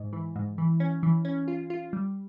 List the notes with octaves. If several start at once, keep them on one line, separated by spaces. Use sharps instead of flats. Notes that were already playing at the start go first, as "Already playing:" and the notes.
Already playing: G#2
E3
G#2
E3
C#4
E3
C#4
F4
F4
G3